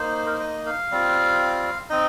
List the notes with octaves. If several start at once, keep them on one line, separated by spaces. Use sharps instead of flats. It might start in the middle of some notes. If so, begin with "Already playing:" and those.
Already playing: A#3 D#4 C5
A#4
C5
D#5
F5
G3 C4 F4
C4 D#4 D#5